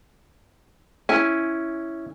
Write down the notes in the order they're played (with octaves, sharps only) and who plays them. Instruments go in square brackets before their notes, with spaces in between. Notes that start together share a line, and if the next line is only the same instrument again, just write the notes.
[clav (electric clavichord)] C#4 E4 [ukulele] G#5